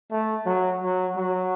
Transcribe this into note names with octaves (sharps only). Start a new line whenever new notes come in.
A3
F#3
F#3
F#3